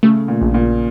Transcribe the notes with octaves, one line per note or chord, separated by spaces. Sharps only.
C#3 A3
A#2
A#1
A#2